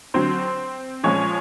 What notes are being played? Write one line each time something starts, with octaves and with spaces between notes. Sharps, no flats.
D3 F#3 C4 C5
A#2 F3 G#3 C#4 C#5